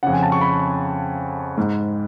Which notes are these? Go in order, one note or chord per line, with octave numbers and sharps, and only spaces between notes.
F2 C#3 F#5
G#5
A5
C#6
B5
G#2